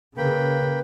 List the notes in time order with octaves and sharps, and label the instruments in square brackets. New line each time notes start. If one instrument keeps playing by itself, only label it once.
[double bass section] C#3 [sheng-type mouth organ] A#3 G5 B5 [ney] B4